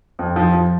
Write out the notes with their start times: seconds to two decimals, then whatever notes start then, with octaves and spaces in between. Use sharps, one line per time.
0.19 F2
0.36 F3
0.53 F3